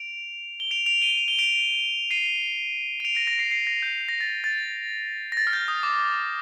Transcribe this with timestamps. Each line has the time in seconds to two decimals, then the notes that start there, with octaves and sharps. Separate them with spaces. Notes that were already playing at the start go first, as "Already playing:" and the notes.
Already playing: D7 F7
0.60 G7
0.71 D7 F7
0.86 D7 F7
1.02 D#7 G7
1.17 F7
1.28 G7
1.39 D7 F7
2.11 C7 D#7
3.00 D#7
3.05 D7 F7
3.15 A#6 D7
3.27 A#6
3.39 C7
3.51 C7
3.67 A#6
3.83 G6
4.09 A#6
4.21 A6
4.44 A6
5.32 A#6
5.37 A6
5.47 F6
5.53 G6
5.68 D#6
5.83 D6